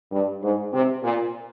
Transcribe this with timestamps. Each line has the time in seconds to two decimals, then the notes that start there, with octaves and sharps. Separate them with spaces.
0.12 G2
0.42 G#2
0.72 C3
1.03 A#2